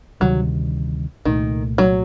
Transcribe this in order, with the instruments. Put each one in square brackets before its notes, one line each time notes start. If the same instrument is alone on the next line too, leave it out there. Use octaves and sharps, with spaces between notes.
[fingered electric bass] D2 C3 D#3 G3 [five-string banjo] F#3
[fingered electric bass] C2 A#2 A3 [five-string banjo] D#3
[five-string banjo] F#3